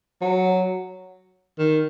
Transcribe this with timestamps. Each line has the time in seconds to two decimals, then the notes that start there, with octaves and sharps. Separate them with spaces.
0.21 F#3
1.59 D#3